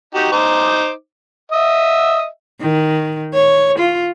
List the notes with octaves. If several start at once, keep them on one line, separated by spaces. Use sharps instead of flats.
D#4 F#4 G4
D#4 C5 D6
D#5 E5
D#3
C#5
F4